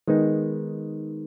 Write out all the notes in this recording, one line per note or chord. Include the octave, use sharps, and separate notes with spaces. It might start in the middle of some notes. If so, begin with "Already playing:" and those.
D#3 G#3 B3 D#4